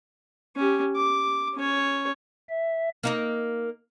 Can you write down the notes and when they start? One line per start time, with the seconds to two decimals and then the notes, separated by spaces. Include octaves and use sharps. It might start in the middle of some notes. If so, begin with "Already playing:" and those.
0.56 C#4 G4
0.96 D6
1.55 C#4 C#5
2.49 E5
3.03 A#3 D#4 A#4